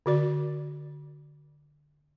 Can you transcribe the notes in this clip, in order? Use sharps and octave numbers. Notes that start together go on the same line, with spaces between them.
D3 F#4 D5